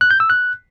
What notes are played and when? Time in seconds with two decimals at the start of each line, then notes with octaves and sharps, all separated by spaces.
0.01 F#6
0.11 G6
0.20 E6
0.30 F#6